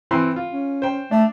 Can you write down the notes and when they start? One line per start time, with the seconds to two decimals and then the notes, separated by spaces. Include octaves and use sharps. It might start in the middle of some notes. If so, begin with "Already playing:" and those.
0.11 E3 C4 C6
0.36 F4
0.53 C#4
0.82 C5 G5
1.11 A3 D4